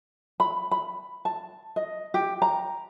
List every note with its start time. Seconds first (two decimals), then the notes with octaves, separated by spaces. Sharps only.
0.40 B5
0.71 B5
1.25 A5
1.76 D#5
2.14 G4
2.42 A#5